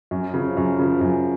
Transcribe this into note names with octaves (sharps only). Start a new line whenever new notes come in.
F#2
C#3 F3
F#2
C#3 F3
F#2